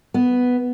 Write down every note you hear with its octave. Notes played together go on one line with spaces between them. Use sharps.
B3